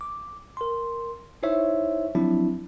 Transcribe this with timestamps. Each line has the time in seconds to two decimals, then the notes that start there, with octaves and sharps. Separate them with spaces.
0.01 D6
0.57 A#4 C6
1.43 D#4 E4 C5 C#5 E5
2.15 F3 F#3 C4 D4 E4